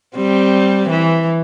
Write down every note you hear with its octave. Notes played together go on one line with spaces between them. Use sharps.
G3 C4
E3